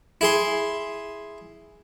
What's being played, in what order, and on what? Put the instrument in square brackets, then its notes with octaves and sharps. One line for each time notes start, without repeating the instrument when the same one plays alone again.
[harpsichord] E4 G#4 C6